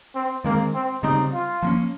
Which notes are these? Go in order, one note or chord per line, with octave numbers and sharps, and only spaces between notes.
C4
D#3 G#3 A#3 C4
C4
C#3 G3 C4 D#4
F4
F3 A#3 C#4